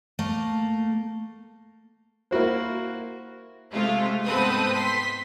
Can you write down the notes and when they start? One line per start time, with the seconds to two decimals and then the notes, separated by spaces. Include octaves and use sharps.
0.19 A3 A#3
2.31 A#3 E4 F#4 C5
3.73 C3 G#3 A3 F4
4.25 G#2 B3 C4 A4 B4 D#6
4.74 C6 B6